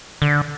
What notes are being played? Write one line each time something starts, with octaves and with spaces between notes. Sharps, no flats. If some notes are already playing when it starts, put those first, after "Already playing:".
D3